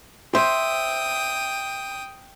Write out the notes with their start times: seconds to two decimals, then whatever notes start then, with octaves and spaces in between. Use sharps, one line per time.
0.35 C5 E5 G5 D#6